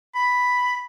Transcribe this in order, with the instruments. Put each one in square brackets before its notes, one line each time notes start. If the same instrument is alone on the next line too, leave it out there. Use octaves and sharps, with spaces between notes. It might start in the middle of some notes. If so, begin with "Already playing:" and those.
[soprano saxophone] B5